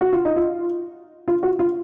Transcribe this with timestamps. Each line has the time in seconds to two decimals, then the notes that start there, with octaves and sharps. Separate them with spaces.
0.01 F#4
0.13 F4
0.25 D#4
0.36 F4
1.28 F4
1.43 F#4
1.59 F4